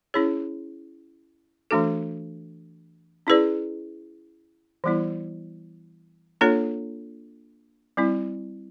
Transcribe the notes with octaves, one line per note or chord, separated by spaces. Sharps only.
C#4 E4 G#4 C#5
E3 A3 D4 F#4 A4
C#4 E4 G#4 B4 D5
E3 G3 B3 E4
A#3 D4 F4 A4 C#5
G3 C4 E4